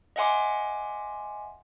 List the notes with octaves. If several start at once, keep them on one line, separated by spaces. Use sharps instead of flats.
D#5 E5 F#5 G#5 C6 D6